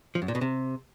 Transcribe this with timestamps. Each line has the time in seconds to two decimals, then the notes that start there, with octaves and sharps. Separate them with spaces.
0.15 F3
0.22 F#2
0.28 A#2
0.35 B2
0.41 C3